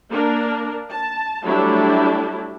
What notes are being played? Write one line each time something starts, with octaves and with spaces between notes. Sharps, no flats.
A#3 D4 A#4
A5
F#3 G3 A3 D4 E4 G4